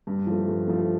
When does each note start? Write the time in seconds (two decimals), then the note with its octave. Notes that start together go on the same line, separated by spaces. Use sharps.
0.07 G2
0.27 F3 A3
0.48 G2
0.67 F3 A3